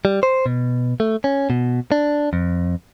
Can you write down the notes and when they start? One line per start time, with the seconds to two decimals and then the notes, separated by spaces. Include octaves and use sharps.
0.05 G3
0.23 C5
0.46 B2
1.00 A3
1.24 C#4
1.50 B2
1.92 D4
2.33 F2